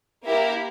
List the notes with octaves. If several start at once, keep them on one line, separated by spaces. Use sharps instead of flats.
A#3 E4 G4 A#4